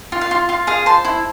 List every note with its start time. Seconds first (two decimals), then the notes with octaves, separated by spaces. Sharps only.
0.12 F4
0.21 F5
0.31 F4
0.49 F4 F5
0.67 G#4 F5
0.86 C5 A5
1.05 E4